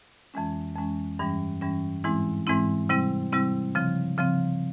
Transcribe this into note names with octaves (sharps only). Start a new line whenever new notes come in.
F2 E3 G#3 C#4
F2 E3 G#3 C#4
G2 E3 G3 C#4
G2 E3 G3 C#4
G#2 E3 G#3 C4 E4
G#2 E3 G#3 C4 E4
C3 G3 C4 E4
C3 G3 C4 E4
C#3 F3 C4
C#3 F3 C4